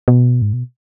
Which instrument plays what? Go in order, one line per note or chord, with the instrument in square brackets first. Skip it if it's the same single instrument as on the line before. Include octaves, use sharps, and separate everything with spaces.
[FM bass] B2
G#2
B2